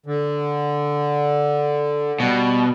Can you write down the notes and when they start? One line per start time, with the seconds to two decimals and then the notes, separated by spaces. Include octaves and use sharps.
0.06 D3
2.20 B2 G3